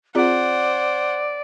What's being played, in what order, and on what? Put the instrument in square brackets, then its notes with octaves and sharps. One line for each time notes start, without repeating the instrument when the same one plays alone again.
[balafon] C4 F4 G#4 [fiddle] C5 F#5 [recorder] D5